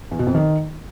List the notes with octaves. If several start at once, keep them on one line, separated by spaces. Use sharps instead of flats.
E2
B2
F2
D#3